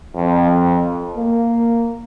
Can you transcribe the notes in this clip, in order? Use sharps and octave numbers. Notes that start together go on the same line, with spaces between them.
F2
A#3